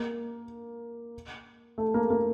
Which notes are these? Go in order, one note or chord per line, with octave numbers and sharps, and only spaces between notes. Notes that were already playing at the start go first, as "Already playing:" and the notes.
Already playing: A#3
A3
A#3
A#3